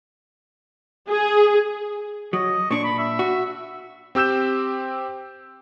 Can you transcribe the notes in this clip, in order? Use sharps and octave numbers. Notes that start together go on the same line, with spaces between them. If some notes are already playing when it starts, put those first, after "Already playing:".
G#4
F#3 D#5
A#2 D4 C#6
B5
E5
F#4
C4 G4 E6 G6 E7